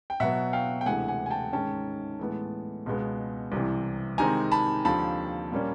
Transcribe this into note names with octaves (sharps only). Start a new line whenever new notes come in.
G5
B2 F#3 B3 E5 F#5
F5 G5
G5
D2 C3 E3 G#3 F#5 G#5
F#5 G#5
G#5
G5 A5
G#2 D#3 G#3 C#4 G5 A5
A2 E3 G#3 B3
C#2 B2 G#3 B3
C2 C3 E3
C3 D#3 G#3 C4 G#5 A#5
A5 B5
D#2 D3 F3 A5 B5
A#2 G3 A#3 C#4